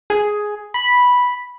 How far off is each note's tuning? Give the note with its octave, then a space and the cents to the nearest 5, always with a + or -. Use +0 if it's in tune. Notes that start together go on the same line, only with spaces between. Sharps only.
G#4 +5
B5 -5